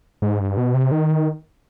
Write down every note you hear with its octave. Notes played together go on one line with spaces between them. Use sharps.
G#2
G2
B2
C3
D#3